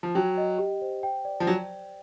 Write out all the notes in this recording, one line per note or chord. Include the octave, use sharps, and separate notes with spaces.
F3
F#3 G5
D#5
G4
C5
G5
D5
F3
F#3